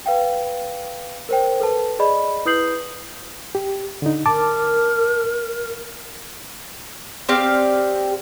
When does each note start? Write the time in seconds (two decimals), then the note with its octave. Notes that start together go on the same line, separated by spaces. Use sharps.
0.06 B4 F5 G5
1.29 A#4 C5 G5
1.60 A4 B4 A5
1.99 G#4 D5 D#5 B5
2.45 E4 B4 D#6 G6 C7 F#7
3.55 G4
4.02 D3 D#4
4.26 A#4 A5 D6
7.29 C4 G4 D5 F5